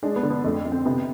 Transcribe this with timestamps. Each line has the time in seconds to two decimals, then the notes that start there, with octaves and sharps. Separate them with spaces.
0.03 G#3 D4
0.16 B3
0.23 D3
0.30 B3
0.44 F2 A3
0.65 F2
0.72 C4
0.85 C3 B3